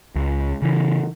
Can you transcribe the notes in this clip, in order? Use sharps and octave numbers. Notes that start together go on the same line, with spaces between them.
C#2
C#3 E3